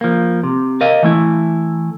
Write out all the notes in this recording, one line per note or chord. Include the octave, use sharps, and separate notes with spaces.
F3 A#3
C3
A#4 D#5 F5
E3 A3 E4